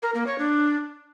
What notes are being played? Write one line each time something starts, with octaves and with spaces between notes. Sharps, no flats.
A#4
A#3
C#5
D4